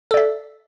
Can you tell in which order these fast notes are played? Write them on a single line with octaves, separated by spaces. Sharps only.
A4 D5 E5